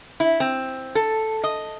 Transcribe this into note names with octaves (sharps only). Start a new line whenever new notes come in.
E4
C4
A4
D#5